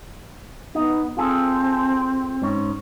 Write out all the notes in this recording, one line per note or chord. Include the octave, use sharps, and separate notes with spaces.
B3 D#4
C4 F4 G#4 A4
G#2 C#4